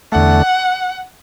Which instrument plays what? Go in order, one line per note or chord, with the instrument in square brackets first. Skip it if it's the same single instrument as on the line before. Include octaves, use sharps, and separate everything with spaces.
[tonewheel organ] E2 D3 A3 [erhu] F#5